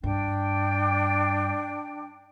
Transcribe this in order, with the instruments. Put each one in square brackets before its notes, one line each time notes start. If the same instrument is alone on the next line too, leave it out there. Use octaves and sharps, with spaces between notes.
[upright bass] G2 [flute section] D4 G5